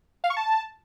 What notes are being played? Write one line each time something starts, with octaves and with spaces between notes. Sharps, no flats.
F5
C#6
A5